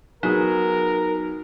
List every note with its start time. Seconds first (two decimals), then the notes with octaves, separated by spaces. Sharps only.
0.23 F#3 B3 D#4 G#4 A#4